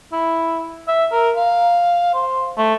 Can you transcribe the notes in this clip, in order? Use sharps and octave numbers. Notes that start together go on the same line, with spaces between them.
E4
E5
A#4
F5
C5
A3